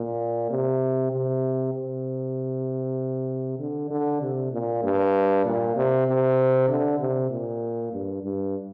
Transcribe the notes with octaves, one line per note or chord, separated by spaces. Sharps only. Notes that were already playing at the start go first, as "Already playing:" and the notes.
Already playing: A#2
C3
C3
C3
D3
D3
C3
A#2
G2
A#2
C3
C3
D3
C3
A#2
G2
G2